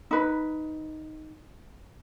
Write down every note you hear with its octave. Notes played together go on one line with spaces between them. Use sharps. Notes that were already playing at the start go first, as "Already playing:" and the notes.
D#4 B4